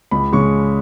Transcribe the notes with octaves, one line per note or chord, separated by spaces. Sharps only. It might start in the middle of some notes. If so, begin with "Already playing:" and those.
C#2 B5
C#3 G#3 C#6